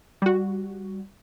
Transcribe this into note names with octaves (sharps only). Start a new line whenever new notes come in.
G3 F#4